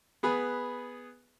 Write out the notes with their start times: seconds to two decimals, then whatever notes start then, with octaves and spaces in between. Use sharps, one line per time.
0.23 B3 G#4 B4